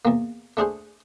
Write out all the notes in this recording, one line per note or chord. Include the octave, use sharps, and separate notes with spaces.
E2 A#3
A3 D4 G#4 C5